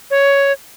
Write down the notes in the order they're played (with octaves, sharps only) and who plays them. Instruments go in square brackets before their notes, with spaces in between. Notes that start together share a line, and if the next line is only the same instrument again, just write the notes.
[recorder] C#5